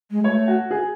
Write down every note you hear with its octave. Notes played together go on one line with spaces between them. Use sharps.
G#3
A3 C#5
F#4
G#4